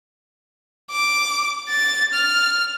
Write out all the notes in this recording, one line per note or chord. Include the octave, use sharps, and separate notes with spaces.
D6
A6
F6